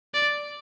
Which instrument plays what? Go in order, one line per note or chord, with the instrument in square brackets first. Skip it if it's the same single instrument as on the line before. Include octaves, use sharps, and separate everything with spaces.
[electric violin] D5